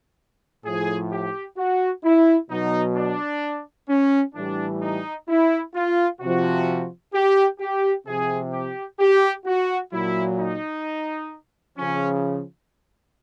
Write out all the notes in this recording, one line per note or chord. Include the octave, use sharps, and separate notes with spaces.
A2 F3 G#4
G4
F#4
E4
B2 F#3 D#4
D4
C#4
A2 E3 G3 D4
D#4
E4
F4
C3 F3 F#4
G4
G4
C3 F3 G#4
G4
G4
F#4
A#2 F#3 E4
D#4
C#3 F3 C#4